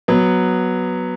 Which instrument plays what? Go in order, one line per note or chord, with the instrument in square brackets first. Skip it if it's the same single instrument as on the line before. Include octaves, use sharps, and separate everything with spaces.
[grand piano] F#3 B3